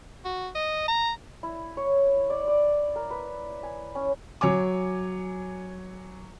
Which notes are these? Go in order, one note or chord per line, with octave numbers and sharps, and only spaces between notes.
F#4
D#5
A#5
E4
C#5
D5
D5
A#4
B4
G#5
C#4
F#3 C#5 G#5 D6